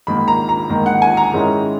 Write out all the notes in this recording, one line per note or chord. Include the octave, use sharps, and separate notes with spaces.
G#2 D#3 A#3 B5
A#5
A#5
G#2 D#3 A#3
F#5
G#5
A#5
G#2 D#3 G#3 C#4 E4